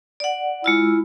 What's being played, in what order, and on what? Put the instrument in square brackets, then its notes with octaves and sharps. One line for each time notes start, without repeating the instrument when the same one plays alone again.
[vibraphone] D5 F#5
[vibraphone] G#3 F4 E6 [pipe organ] E4